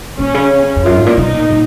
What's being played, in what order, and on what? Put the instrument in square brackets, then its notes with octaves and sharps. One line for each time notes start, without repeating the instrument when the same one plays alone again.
[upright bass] A#2 [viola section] C#4
[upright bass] C#3
F2
[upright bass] F#2 [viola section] F4
[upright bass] G#2
A#2
[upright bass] B2 [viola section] D#4
[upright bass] A#2
A#2